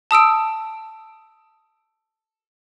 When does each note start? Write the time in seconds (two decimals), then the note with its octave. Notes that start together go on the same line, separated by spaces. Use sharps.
0.11 A5 D#6 E6 D7